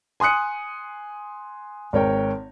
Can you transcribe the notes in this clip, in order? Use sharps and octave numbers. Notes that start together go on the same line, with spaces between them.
G#5 C6 D#6 F#6 C#7
G#1 A#4 C#5 G5